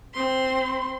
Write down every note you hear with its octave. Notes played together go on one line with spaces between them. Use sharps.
C4 C6